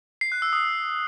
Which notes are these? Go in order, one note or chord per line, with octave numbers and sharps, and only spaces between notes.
C7
F#6
E6
D#6